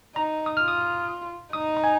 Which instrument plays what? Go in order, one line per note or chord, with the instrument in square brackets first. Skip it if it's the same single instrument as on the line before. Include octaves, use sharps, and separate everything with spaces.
[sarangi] D#4 [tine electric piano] A#5
[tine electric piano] D#6
[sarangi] F4 [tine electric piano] F6
[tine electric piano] D#6
[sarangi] D#4 [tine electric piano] D#6
[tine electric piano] A#5
G#5